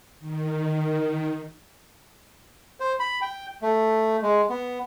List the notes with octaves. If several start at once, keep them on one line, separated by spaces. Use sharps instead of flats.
D#3
C5
B5
G5
A3
G#3
B3